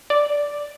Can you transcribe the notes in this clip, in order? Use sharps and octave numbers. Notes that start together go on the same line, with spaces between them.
D5